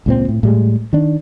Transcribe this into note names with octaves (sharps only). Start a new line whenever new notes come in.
C#2 A#2 C4
A2
A2 G3 G#3
D#3 D4